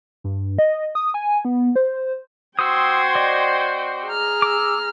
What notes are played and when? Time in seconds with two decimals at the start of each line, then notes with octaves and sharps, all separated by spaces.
0.24 G2
0.59 D#5
0.95 D#6
1.14 G#5
1.45 B3
1.76 C5
2.59 C4 F#4 C5 G5 C6 D#6 E6 G#6
3.15 D5 D#5
4.08 G#4 A#5 F6
4.42 D6 E6